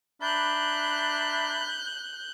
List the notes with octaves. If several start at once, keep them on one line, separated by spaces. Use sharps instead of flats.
D4 E5 A#5 B5 F#6 G6